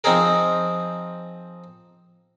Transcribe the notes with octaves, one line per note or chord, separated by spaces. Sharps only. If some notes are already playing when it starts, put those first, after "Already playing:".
F3 C4 D#4 G#4 A#4